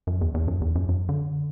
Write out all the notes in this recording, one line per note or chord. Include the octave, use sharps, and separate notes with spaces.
F#2
E2
E2
F#2
E2
F#2
F#2
D3